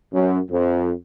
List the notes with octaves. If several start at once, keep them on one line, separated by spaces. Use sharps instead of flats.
F#2
F2